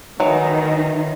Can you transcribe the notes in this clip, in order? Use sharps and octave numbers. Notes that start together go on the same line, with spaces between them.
D#3 E3 F#3 D#4